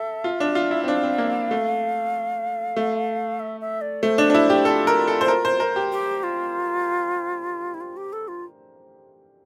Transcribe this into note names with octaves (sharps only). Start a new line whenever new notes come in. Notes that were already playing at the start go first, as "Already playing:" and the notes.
Already playing: A4 E5
F4
D4
F4
E4
C4
D4 F5
C4
A#3
A3
A3
E5
E5
D5
A3 C5
D4
D4
E4
G4
F4 A4
A#4
A4
C5
A#4
C5
A#4
G4
G4
F4
E4
F4
G4
A4
F4